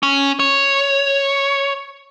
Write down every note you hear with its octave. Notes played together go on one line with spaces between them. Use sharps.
C#4
C#5